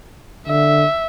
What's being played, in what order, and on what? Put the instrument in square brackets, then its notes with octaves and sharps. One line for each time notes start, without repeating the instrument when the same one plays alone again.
[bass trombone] D3 [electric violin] E5